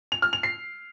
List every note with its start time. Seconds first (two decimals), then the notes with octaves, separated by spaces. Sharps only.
0.12 F7
0.22 F6
0.33 F7
0.43 C7